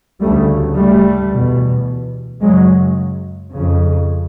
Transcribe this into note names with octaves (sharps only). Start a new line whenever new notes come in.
D2 C#3 G3 A3
G3 A3
E2 B2
F#2 C#3 F#3 G#3
F2 C#3